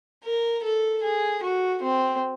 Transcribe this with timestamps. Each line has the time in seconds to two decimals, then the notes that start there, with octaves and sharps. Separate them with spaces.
0.24 A#4
0.64 A4
1.03 G#4
1.42 F#4
1.82 C4